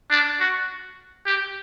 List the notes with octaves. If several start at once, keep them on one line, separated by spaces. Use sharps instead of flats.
D4
F#4
G4